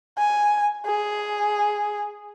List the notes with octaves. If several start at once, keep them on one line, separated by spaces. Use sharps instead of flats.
G#5
G#4